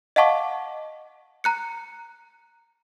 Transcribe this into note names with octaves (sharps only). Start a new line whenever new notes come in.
D#5 F5 F#5 A5 C#6 D6
A#5 F#6 C#7